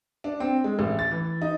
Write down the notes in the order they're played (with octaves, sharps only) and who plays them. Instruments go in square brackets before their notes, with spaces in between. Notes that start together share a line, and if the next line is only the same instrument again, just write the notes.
[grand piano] D4
C4
G#3
A1
A6
E3
D#4